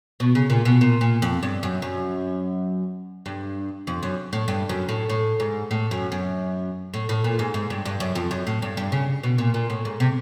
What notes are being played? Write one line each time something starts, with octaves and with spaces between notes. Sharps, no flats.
B2
C#3
A#2
B2
A#2
A#2
F2
G2
F#2
F#2
G2
F2
F#2
A2
G2
F#2
A2
A2
G#2
A2
F#2
F#2
A2
A2
A#2
G#2
G#2
G2
G2
F#2
F2
F#2
A2
G2
G2
C#3
B2
A#2
A#2
A2
G#2
C3